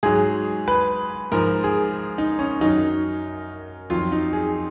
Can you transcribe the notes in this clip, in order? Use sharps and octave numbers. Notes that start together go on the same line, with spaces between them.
G#2 F#3 G#4
B4
G#2 F3 A#4
G#4
D#4
C#4
F#2 D#3 F#3 D#4
F2 D#3 F#3 F4
D#4
G#4